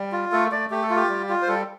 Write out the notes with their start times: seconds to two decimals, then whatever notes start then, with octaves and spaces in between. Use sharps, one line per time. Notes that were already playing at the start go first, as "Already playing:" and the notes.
Already playing: G3
0.12 F4
0.32 A3 A4
0.52 A3 D5
0.70 A3 G4
0.83 A4
0.90 F4
0.96 G4
1.09 G3
1.29 F4
1.42 C5
1.48 G3 A4